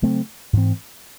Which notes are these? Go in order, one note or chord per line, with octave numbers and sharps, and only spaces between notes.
C#3 F#3 A3 C4
G#2 E3 C4